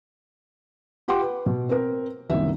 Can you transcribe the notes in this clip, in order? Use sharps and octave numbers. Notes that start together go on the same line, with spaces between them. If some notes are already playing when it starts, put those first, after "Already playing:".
F4 G4 F#5 G5 C6 D6
B4
B2
C4 A#4
F#1 C2 D#3 E5